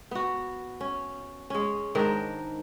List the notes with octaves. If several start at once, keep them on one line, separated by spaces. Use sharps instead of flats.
B3 F#4
C#4
G#3 C#4
G#2 D#3 D4 A#4